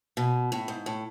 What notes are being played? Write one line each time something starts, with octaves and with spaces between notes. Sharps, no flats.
B2
A2
G#2
A2